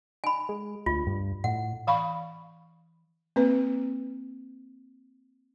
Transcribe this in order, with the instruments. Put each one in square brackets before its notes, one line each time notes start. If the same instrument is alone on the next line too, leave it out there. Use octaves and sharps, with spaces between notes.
[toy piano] G#5 B5
[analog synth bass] G#3
[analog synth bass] D2 [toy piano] F4
[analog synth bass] G2
[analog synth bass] A2 [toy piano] F#5
[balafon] E3 F5 B5 C#6
A#3 C4 B4